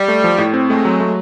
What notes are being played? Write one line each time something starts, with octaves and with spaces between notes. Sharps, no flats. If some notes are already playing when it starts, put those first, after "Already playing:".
Already playing: G3
A3
F3
A2
C4
G#3 A3
F#3
A3